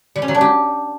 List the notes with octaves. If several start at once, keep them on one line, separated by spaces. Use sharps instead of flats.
G3
C#4
F#3
D4
G4